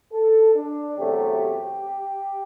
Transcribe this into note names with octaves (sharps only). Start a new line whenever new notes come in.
A4
D4
E2 C3 F#3 A3 G4